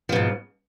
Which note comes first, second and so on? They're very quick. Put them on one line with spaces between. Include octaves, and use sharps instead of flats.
F3 B2 G#2